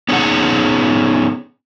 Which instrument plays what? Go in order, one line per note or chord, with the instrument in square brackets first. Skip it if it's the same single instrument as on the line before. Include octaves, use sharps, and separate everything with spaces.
[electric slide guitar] B3 C#4 D#4 G#4 F#5